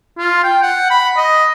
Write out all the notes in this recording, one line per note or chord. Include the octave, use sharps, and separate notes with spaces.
F4
G5
F#5
B5
D#5